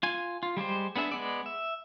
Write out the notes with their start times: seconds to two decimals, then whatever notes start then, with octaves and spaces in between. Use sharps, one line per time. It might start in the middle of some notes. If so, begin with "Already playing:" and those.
0.03 F4 G#5
0.43 F4
0.57 G3 G#3 G4 C5
0.96 B3 D4 G#4 E5
1.12 G#3 B3 D5
1.46 E5